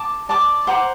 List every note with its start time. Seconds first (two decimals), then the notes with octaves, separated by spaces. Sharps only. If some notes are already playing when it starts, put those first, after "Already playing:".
Already playing: A5 D6
0.29 D5 A5 D6
0.67 C5 F#5 A#5 D6